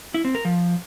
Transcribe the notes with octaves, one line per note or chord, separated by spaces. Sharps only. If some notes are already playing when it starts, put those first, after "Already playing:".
E4
C4
A#4
F3